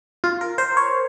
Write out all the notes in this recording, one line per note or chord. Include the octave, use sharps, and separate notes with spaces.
F4
A#4
C5
C#5